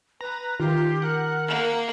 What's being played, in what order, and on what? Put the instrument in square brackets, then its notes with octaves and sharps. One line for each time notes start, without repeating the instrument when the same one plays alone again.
[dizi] B4 [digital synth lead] A#5
[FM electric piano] D#3 [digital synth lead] F4 [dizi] G4
[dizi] A#4 [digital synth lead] F#5
[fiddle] A#3